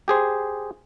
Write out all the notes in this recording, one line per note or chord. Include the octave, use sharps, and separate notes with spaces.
G4 G#4 C5